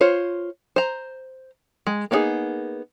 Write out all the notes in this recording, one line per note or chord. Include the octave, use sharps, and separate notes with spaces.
F4 C5 C#5
C5 A#5
G#3
A#3 B3 D4 D#4 G#4